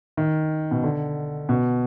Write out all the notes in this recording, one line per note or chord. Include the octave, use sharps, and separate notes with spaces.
D#3
B2
D3
B2